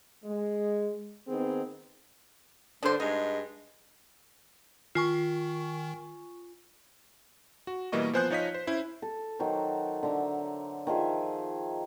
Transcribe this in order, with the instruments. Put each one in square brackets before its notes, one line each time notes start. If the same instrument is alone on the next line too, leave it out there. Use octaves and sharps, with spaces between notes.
[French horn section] G#3
D#3 B3 C4 D#4 G#4
[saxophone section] G2 D3 [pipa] D4 C5
[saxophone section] G2 G#3 [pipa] D#4
[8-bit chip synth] D#3 [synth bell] F4 G#5 C#6
[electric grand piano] F#4
B2 E3 G3 A#3 D#5 C#6
F3 B3 C5 G#5 F#6 G6
F3 D#4 C#5 D#5 F5 B6
C5
C#4 E4 C5
[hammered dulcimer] A4
D#3 F#3 F#4 C5
D3 E5 A#5
D#3 F3 G#4 E5